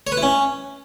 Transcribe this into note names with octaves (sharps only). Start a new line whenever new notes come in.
C#5
B4
E4
C#4